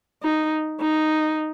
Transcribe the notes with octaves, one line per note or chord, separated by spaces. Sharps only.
D#4
D#4